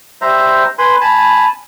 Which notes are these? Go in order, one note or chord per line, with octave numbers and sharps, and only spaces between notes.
G3 C5 E5 A#5
B4 G#5 B5 C6
G#5 A5 B5